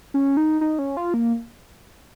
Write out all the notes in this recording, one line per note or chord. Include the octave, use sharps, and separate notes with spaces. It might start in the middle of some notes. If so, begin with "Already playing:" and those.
C#4
D#4
D#4
C#4
F4
A#3